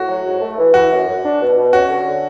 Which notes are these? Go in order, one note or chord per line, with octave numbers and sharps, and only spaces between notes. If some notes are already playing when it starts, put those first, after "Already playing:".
Already playing: A2 F#4
F#3
G#2
A3
E3
E3 F#4
F#2
F#2
D4
B2
B2
C#4 F#4
D3
D3